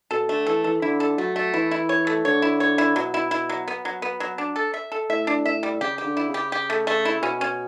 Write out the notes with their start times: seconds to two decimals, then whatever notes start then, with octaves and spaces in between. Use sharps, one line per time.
0.11 B2 A4
0.29 D3 A3
0.47 E3 A4
0.64 E3 A4
0.82 D3 E4
1.00 A4
1.18 F#3 A3
1.36 A3
1.54 E3 E4
1.71 E4
1.89 C#5
2.07 A3
2.24 D3 C#5
2.42 E4
2.60 C#5
2.78 E4
2.96 B2 F#3
3.14 E4
3.31 E4
3.49 F#3
3.68 B3
3.85 F#3
4.02 B3
4.20 F#3
4.38 D4
4.56 A4
4.74 E5
4.92 A4
5.10 A2 E5
5.27 D4
5.46 E5
5.63 G3
5.81 C#3 G4
5.98 G4
6.04 D3
6.17 E4
6.28 C#3
6.34 G4
6.52 G4
6.70 A3
6.87 A3
7.05 E4
7.22 B2 C#4
7.41 C#4